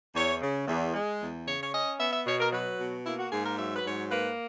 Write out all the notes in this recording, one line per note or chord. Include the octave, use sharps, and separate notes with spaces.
E2 C#5
C#3
E2
G#3
E2
C#3 C#5
C#5
C#4 D#5
B3 E5
E5
B2 C#5
A#4
F#3 B4
B2
A#3 E4
F#4
G#2 G#4
A#4
F#3 E5
B4
G#2 C#5
A#3 B4